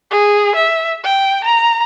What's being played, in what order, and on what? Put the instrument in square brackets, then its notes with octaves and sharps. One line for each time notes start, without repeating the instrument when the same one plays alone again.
[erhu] G#4
E5
G5
A#5